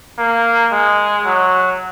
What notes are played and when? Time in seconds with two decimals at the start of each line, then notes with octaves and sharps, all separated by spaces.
0.19 A#3
0.72 G#3
1.26 F#3